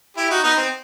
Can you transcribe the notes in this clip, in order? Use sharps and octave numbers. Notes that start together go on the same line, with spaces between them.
E4 G4
D#4 F#4
B3 D#4
C4